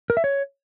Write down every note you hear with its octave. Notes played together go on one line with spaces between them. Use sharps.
A#4
E5
C#5